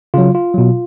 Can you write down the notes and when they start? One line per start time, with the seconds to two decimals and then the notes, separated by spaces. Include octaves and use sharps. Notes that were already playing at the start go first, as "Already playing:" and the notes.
0.14 C#3 F#3 F4
0.35 F4
0.54 B2 F#3